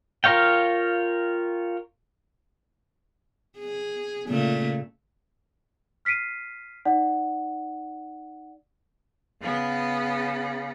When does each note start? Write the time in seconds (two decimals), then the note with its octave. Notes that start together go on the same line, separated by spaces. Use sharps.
0.24 F4 A#4 C#5 F5 G5
3.59 G#4
4.28 A#2 C#3 A3
6.05 F6 B6 C7 D7 D#7
6.85 D#4 D5 F#5
9.42 C#3 B3